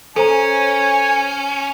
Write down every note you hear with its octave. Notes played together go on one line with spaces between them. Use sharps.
C#4 A4 C5 G#5 A#5